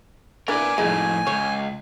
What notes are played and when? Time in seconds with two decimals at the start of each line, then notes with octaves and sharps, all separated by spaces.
0.48 D4 E4 A#4 B4 D5 G#5
0.78 F2 A2 G#3 D#4
1.27 C#2 C#5